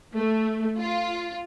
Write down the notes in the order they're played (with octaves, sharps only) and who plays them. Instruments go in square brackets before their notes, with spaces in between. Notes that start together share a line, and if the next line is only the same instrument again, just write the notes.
[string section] A3
F4